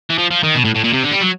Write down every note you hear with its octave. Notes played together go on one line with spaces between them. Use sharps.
E3
F3
F3
D#3
B2
A2
A2
A#2
C3
D3
G3
F#3